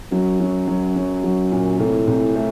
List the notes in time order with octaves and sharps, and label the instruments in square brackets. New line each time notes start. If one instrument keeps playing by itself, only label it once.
[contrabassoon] F#2 [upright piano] F#3
[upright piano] F#3
F#3
F#3
F#3
A#2
[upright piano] C2 [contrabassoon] A2
[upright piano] C2
A3